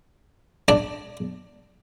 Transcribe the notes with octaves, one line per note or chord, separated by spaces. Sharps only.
D4 D5